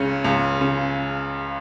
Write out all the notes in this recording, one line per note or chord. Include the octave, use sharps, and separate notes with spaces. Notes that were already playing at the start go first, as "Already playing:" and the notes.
Already playing: C#2 C#3 C#4
C#2
C#3